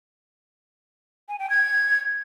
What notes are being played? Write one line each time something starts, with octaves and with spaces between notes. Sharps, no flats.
G#5
G5
G#6